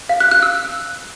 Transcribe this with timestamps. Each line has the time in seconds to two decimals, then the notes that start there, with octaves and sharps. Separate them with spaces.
0.09 F5
0.20 F#6
0.31 F#6
0.43 E6